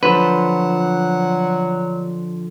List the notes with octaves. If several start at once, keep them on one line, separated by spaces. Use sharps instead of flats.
D3 F3 F#3 B4 C5 F#5